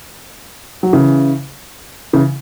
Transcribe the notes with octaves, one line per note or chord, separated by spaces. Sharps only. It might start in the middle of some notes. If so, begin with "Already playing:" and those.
F#3
C#3 E3
C#3 E3